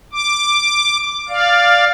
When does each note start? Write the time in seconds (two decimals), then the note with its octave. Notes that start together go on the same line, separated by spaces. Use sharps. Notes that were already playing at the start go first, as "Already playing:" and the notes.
0.13 D6
1.29 D5 F5